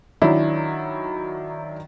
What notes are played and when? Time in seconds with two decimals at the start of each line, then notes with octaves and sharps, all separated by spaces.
0.22 D#3 F#3 D4 E4